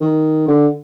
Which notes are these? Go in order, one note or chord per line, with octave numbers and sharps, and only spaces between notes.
D#3
D3